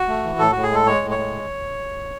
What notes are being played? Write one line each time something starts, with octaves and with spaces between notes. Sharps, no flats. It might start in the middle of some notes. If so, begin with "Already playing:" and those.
Already playing: F#4
A3
E3
A2 A4
A2 F#4
G#4
G#3 A4
G#3 C#5
A2
C#5
G#3